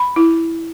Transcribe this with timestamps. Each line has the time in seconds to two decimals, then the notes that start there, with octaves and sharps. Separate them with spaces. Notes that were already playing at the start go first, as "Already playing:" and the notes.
Already playing: B5
0.16 E4